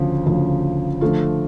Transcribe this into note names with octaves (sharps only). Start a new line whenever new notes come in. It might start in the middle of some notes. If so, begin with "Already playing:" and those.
Already playing: D2 C#3 F3
D2 C#3 F3
D3 F3 A3 F4